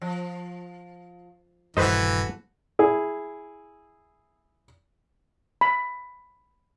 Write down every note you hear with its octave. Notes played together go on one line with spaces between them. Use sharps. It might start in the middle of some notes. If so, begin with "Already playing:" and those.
F3
D#1 G2 E3 F#4 A4 B4 C5 D#5
E4 G#4
B5